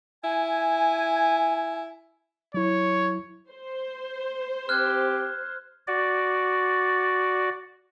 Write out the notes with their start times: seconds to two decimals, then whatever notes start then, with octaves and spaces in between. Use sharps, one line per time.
0.24 E4 G#5
2.54 F#3 E4 C#5
3.50 C5
4.69 C4 G4 F6 F#6 G#6
5.87 F#4 D5